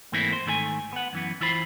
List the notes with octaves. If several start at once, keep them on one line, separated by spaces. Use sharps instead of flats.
G#2 E3 A3 A#3 C4 E4
C5
G#2 D#3 A3 B4 G#5
B3 F#5
F#2 E3 B3
E3 E4 F4 C5 B5